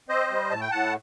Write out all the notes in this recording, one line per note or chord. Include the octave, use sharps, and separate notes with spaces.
C4 C5 D#5
G3
A2 A5
G5
A2 F#5 A5